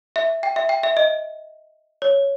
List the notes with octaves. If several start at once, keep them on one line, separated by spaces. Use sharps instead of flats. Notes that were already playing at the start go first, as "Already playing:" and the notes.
E5
G5
E5
G5
E5
D#5
C#5